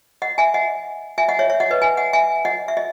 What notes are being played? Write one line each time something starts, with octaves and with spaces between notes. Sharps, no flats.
D#5 F#5
E5 G#5
D#5 F#5
E5 G#5
D#5 F#5
C#5 E5
C#5 E5
D#5 F#5
B4 D#5
E5 G#5
D#5 F#5
E5 G#5
D#5 F#5
E5
D#5